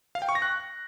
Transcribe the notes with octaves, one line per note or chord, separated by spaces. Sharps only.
F5
G5
C#6
A#6
F#6